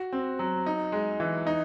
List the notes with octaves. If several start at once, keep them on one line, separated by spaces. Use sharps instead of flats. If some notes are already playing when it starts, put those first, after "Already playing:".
Already playing: F#4
C4
F#3
D#4
G#3
E3
D#4